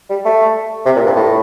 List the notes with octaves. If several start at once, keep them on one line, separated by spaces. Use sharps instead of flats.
G3
A3
C3
A#2
G2
A2